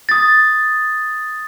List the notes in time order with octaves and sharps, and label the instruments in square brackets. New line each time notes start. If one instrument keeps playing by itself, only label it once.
[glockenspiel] D#6 A6